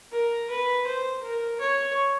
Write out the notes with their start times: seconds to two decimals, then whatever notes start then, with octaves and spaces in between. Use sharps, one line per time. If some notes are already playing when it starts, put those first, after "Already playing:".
0.12 A#4
0.50 B4
0.87 C5
1.23 A#4
1.60 C#5